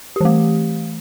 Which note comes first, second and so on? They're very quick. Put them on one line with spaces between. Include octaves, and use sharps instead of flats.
G4 E3 A3